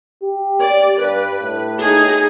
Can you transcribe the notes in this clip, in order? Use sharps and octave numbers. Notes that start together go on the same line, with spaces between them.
G4
D5
G2 B4
A2
D#4 G#4